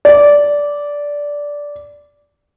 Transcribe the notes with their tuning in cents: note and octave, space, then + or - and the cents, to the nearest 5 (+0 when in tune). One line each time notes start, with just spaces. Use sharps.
D5 -10